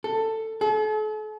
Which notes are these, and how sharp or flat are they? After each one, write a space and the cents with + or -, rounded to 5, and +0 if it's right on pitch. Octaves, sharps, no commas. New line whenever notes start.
A4 +15
A4 -45